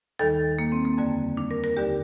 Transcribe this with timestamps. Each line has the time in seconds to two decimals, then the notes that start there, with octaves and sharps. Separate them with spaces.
0.19 D#2 D#3 G3 A4
0.59 A#3
0.72 C4
0.85 A#3
0.98 F2 D3 G3
1.37 D4
1.51 A#4
1.64 A#4
1.76 D#2 D3 G3 G4